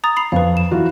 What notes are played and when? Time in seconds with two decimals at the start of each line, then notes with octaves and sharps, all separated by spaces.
0.04 A#5 D#6 A6
0.16 B5 C7 F7
0.32 F2 B4 F5
0.57 E7
0.71 E3 F4 F#4